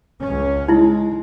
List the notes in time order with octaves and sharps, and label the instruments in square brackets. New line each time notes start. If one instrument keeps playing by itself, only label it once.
[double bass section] C#2 C#4
[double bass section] G#3 [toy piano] D#4 E4